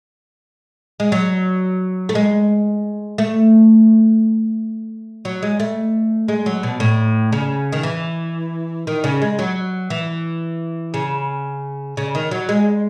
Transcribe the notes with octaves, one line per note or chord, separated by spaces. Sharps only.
G#3
F#3
A3
G#3
A3
F#3
G#3
A3
G#3
F#3
B2
A2
C#3
D#3
E3
D#3
C#3
G#3
F#3
E3
C#3
C#3
D#3
F#3
G#3